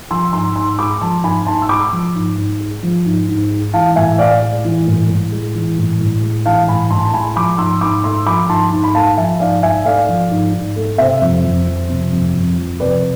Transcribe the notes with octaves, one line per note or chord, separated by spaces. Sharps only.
F3 C6 E6
G#2 C6 E6
G#2 C6 E6
G#3 B5 D6
F3 A5 C6
G#2 G#5 B5
G#2 A5 C6
E6
G#3 B5 D6
F3
G#2
G#2
G#3
F3
G#2
G#2
G#3
E3 F5 A5
A2 E5 G#5
A2 D5 F5
G#3
E3
A2
A2
G#3
E3
A2
A2
G#3
E3 F5 A5
A2 G#5 B5
A2 A5 C6
A5
G#3 G#5 B5
F3 B5 D6
G#2 C6 E6
G#2 B5 D6
A3 C6 E6
F3 B5 D6
G#2 A5 C6
G#2
B5
A3 F5 A5
F3 E5 G#5
G#2 D5 F5
G#2 E5 G#5
A3 D5 F5
F3
G#2
G#2
A3
C3 C5 E5
F2
F2
F3
C3
F2
F2
F3
C3 B4 D5